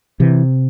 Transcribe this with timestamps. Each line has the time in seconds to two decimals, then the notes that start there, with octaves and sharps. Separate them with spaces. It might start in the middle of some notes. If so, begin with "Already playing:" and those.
0.20 C3 E3